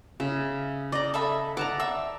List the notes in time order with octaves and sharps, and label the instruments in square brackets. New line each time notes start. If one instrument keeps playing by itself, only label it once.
[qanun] C#3 [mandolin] E5
[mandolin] D5 A#5 [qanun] D#5
[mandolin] A4 E5 B5
[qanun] D5 A5 A#5 [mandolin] F#5
[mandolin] E5 E6